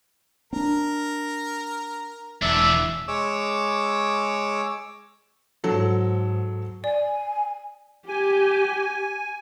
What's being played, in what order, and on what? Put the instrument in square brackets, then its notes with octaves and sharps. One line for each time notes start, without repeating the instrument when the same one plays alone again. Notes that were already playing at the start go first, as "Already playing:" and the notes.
[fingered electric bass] C4 D4 [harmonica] A#4
[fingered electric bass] E1 [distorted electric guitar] E2 D4 [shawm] E5
[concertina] G#3 C#5 D6 E6
[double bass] G#2 [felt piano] F#3 A4
[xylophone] D5 [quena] G#5
[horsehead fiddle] G4 [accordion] G#5